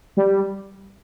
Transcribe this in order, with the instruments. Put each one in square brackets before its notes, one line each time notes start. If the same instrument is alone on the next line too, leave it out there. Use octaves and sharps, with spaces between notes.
[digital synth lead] G3